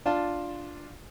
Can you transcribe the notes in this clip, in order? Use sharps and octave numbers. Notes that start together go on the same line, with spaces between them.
D4 F4 A5